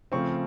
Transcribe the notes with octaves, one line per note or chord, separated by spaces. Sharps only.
C#3 F3 A3 C4 C#6